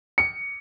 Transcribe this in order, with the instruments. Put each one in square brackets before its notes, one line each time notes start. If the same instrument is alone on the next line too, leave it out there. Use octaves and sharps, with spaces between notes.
[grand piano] C#7